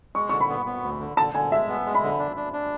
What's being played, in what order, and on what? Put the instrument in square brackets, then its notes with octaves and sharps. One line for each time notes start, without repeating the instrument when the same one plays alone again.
[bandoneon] G#3 [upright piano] C#6
[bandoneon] D3 [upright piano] C#6
[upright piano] B5
[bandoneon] B3
B3
D2
D3
[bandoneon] D3 [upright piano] A5
[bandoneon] D3 [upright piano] G#5
[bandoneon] G#3 [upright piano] E5
[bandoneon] B3
G#3
[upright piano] B5
[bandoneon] D3
D4
D4
D4